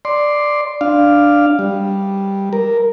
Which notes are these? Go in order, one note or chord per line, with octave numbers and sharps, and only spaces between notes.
D5 C6
D4 F5
G3
A#4